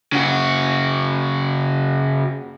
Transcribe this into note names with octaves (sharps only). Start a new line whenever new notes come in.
C#3 F#4